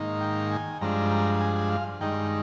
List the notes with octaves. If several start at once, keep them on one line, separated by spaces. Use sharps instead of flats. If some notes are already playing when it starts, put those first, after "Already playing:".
Already playing: G#2 D#3 A#3 D#4
G5
G#5
G2 F3 G#3 D4 A#5
A#5
A#5
G#5
G#5
F5
G2 D#3 G#3 D#4 G5